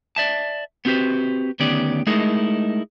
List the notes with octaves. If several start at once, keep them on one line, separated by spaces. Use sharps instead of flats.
D5 E5 A5
B3 C4 F#4 G4 B4 C5
D2 D#3 B3 C#4 G4 D5
G#3 A3 D#4 E4 G#4 A#4